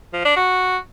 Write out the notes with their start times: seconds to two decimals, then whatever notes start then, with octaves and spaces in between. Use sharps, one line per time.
0.13 F3
0.25 D4
0.36 F#4